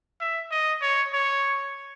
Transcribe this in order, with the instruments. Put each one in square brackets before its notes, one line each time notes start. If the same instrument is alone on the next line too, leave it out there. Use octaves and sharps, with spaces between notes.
[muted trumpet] E5
D#5
C#5
C#5